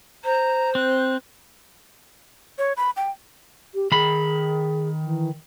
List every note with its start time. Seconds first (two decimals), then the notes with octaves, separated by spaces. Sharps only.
0.25 C5 A#5
0.75 C4 F#6
2.58 C#5
2.77 B5
2.97 G5
3.75 G4
3.92 D#3 G#4 B5
5.03 E3